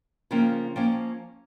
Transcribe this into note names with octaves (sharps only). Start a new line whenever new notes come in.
C#3 F3 A#3 C#4 G5
F3 A#3 C#4 G5